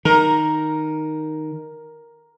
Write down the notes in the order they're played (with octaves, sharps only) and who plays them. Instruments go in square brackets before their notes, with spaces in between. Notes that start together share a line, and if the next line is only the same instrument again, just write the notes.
[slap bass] D#3 [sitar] A#4